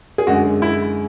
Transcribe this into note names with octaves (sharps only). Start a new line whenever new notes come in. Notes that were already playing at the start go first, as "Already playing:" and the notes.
G#4
F#2 D3 G#3 F#4
E4